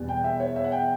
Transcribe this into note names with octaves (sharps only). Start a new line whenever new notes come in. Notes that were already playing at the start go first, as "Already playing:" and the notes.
Already playing: E2 B2 G3 B3
G5
E5
C#5
E5
F#5
G5